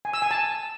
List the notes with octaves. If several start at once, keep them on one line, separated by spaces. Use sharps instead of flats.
G#5
E6
G#5
A5